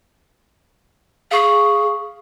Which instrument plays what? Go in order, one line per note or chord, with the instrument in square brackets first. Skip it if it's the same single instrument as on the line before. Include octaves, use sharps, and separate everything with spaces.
[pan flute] G#4 [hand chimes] F5 C#6